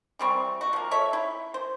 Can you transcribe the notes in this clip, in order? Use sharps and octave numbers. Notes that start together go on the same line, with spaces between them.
E3 G3 C4 C#6
F#4
F3 A#3
A4 C#5 E5
E4
C5